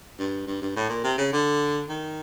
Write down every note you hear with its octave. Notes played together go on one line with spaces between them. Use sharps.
G2
G2
G2
A2
A#2
C3
C#3
D3
D#3